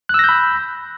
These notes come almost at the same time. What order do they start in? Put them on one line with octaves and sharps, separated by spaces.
F#6 E6 A#6 G6 B5